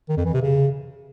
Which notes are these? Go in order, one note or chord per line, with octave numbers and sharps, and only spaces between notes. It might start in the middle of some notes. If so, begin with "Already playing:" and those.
D#3
F2
E3
C3
C#3